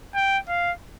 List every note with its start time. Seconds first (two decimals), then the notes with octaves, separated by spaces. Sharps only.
0.15 G5
0.48 F5